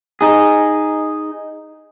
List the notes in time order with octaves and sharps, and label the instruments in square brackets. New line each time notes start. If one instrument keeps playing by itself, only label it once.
[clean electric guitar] D#4 G#4